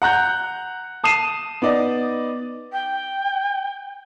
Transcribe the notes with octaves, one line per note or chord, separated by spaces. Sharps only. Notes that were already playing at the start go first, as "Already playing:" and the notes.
F#5 A#5 F#6 G6
A5 D#6 C7 D#7 E7
B3 D#4 D5 D#5
G5